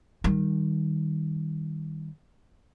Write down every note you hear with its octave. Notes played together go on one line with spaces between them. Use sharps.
D#3 G3